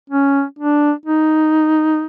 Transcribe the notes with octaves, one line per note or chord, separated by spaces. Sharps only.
C#4
D4
D#4